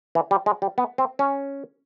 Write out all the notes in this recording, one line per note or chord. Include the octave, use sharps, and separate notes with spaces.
E3
G3
G#3
G3
B3
C4
C#4